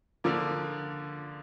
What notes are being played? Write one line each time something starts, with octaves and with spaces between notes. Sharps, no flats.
D3 F3 A#3